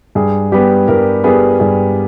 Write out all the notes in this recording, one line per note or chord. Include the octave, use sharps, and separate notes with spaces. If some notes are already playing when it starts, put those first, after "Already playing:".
G2 G#4
G3 B3 G4
G2 A#4
G3 B3 G#4
G2 G#4